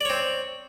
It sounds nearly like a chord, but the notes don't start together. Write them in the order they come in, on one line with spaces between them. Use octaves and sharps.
D5 C#5 C4